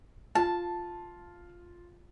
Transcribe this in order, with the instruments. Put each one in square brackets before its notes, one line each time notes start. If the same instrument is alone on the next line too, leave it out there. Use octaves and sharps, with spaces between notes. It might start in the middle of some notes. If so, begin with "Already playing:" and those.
[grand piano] F4 [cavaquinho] A5